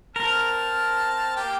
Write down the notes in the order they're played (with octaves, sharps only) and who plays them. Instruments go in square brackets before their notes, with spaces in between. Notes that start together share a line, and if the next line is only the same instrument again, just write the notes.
[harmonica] C4 A5 F6 [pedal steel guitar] A#4
[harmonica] A#3 G4 G5